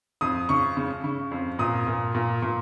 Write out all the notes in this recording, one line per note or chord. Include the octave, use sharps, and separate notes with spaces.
F2 D#6
C#3 C#6
C#3
C#3
F2
A#2 D#6
A#2
A#2
A#2